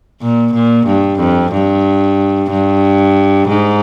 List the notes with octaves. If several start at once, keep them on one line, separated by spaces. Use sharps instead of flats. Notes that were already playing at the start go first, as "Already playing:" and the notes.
A#2
A#2
G2
F2
G2
G2
G#2